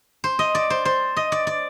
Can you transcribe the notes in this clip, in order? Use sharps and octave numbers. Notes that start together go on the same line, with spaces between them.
C5
D#5
D5
C5
C5
D#5
D5
D5